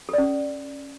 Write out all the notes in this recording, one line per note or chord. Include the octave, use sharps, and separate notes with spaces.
C#4 A4 D5